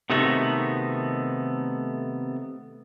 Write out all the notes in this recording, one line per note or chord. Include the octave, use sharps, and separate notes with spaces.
C3 D#3 A3 B3 D#4 F#4